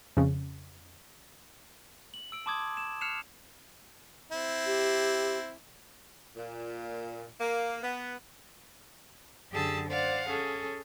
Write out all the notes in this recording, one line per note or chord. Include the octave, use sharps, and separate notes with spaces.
F2 C#3
F#7
E6 D7
A5 C6 D6 D#6 G#6
E7
F6 F#6 C7 C#7 E7 F7
C4 E4
G4
A#2
A#3
B3
F#2 D3 G4 G#4 A5 E6
C5 D5 F5 F#5
C#4 G#4 A4